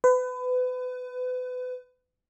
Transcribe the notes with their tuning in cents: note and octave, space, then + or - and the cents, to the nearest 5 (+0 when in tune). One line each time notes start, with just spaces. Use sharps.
B4 +30